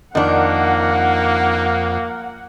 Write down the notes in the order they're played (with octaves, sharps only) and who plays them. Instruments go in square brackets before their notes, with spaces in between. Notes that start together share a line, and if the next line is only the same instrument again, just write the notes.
[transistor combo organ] F2 [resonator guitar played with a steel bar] D#3 D4 [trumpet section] A#3 [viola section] F#5